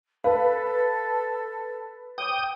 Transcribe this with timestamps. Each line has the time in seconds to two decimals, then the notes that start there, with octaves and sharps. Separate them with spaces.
0.24 A4 B4 F5
2.18 C5 C#5 G5 D6 D#6